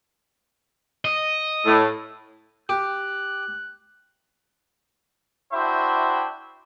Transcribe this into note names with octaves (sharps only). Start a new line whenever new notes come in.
D#5
A2 A4
G4 F#6
D4 E4 F#4 C5 E5 G5